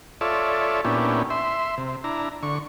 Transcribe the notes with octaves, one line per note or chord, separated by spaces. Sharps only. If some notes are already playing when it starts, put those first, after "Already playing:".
F4 A4 C#5 D5 E5
A#2 B3 C#4 D4 E4 G4
E5 C6
C3
D4 E4 A#5
D3 C#6